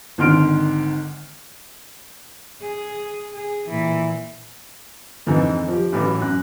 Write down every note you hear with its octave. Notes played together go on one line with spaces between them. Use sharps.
G#1 D3 D#3 C6 F6 D7
G#4
G#4
A#2 E3
F2 G#2 D3 E3
F3 G4
A1 A2 E3 F#3 D6
F#2 F#6